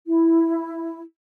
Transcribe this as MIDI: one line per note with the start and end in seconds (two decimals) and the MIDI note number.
0.06 1.02 64